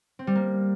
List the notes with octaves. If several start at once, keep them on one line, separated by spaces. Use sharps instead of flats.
C4
G3
A#3